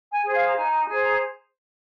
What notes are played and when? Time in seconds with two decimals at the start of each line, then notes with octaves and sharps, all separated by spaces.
0.12 G#5
0.23 G#4 C5 G#5
0.34 F5
0.47 A#5
0.55 D#4 G#5
0.71 G#5
0.87 G#4 C5 G#5
1.04 A#5